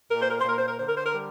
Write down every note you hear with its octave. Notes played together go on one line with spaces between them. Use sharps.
A#2 A#4
C5
A#4
C5
A#2 A#4
C5
A#4
D3 C5
A#4
C5
A#4
G3